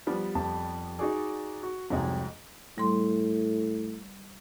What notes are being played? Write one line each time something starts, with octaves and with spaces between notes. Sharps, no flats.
F3 G3 B3
F2 A5
D#4 F#4 G#4 D5
F#4
C2 F2 G#2 F#3 G#3
A2 G3 C6